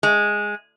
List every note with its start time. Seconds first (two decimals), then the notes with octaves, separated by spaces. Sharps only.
0.03 G#3